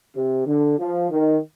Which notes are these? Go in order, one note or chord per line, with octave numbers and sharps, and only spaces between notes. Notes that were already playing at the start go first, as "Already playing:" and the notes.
C3
D3
F3
D#3